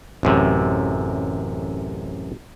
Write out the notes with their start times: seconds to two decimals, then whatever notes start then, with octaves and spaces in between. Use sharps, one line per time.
0.23 A1 F#2 C3